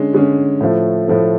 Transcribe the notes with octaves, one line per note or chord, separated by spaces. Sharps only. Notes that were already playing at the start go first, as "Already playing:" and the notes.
Already playing: D3 G#3 C#4
D3 G#3 C#4
A2 F3 A3
A2 F3 A3